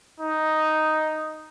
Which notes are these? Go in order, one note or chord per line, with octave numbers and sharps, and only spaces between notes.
D#4